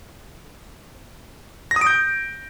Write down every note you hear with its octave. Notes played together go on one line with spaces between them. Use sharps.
A#6
D#6
D7
G6